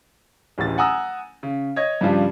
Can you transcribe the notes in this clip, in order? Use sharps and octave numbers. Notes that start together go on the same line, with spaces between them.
D1 A1 A6
F#5 G#5 A#5 D#6 E6
C#3
C#5 D#5 G#6
G2 C#3 F3 G3